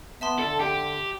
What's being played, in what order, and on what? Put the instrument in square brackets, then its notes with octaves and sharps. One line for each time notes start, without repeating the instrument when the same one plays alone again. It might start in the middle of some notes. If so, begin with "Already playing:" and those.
[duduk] B3 [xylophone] E5 A5 C6
[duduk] D3 [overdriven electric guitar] A4
[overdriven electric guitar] G4